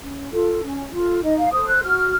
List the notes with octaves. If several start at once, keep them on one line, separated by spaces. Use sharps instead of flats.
C#4
F4 A4
C#4
F4 A4
D#4 D#5
F5
A4 C5 D#6
F#6
F#4 F6